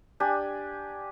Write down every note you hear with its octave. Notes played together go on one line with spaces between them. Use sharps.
D4 G4 G#5